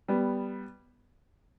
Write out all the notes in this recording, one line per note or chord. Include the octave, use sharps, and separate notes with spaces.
G3 B3